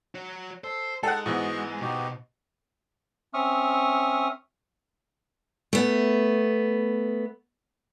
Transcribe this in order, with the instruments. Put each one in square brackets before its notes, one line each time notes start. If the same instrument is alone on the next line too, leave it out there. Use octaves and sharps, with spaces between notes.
[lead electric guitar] F#4 C#5
[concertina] A4 [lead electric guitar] C5
[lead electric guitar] G#3 [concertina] D#4 [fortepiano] A4 F#5
[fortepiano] G#2 E3 B3 [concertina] F#4 D#5 C#6
[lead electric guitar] B2 [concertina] D#4 F#4 G4
[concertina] C4 C#4 E5 C#6 D#6 F6
[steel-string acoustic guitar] A3 B3